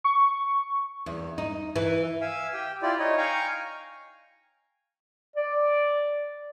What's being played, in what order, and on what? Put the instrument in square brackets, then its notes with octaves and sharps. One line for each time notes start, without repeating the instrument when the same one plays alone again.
[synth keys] C#6
[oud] E2
D#4
E3
[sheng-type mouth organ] E5 F5 G#5 E6
G4 G5
E4 F4 G4 D5
D#4 C#5 D#5
F5 G5 G#5 A#5 C#6
[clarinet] D5